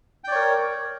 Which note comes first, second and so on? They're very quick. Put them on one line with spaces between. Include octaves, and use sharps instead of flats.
G5 D5 C#5 A#4